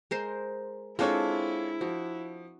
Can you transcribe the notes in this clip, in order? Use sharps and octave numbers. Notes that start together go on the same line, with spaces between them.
G#3 A#4 C5
G#3 C4 D4 E4 F4 A4 C#5
F3 F#4